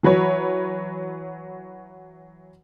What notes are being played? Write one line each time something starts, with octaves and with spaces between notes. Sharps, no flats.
E3 F#3 B4 C#5